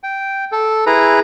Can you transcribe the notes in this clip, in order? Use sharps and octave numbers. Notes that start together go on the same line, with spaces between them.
G5
A4
E4 G#4 B4 A#5